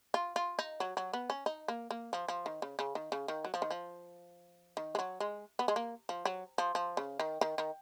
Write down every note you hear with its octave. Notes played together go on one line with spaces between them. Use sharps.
F4
F4
D#4
F#3
F#3
B3
C#4
D#4
A#3
A#3
F3
F3
D#3
C#3
C#3
D#3
C#3
D#3
F#3
F3
D#3
F3
D#3
G#3
F#3
G#3
B3
G#3
A#3
F3
F#3
F3
F3
C#3
D#3
D#3
D#3